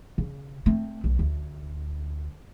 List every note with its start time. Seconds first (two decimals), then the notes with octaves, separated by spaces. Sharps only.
0.18 C#3
0.66 A3 C4
1.04 B1
1.19 D2